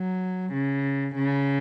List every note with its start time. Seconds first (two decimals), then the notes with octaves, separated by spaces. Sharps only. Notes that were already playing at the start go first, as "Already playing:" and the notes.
Already playing: F#3
0.53 C#3
1.16 C#3